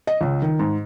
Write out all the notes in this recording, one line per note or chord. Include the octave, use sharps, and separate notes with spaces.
D#5
C#2
D#3
G#2